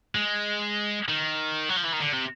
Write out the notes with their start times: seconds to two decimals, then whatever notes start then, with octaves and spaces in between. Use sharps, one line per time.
0.15 G#3
1.09 D#3
1.70 F#3
1.77 F3
1.85 E3
1.93 D#3
2.01 D3
2.13 C3